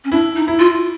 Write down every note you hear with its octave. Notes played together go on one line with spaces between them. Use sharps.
C#4
D4 E4
D#4
E4
F4